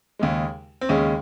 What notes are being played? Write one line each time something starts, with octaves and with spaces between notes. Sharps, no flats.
D#2 C#3 G#3
C4
D#2 C#3 G#3 C#4